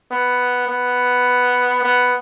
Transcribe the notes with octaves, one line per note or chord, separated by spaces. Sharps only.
B3
B3
B3